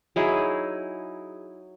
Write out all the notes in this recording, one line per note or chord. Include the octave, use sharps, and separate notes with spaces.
F#3 D#4 E4 G#4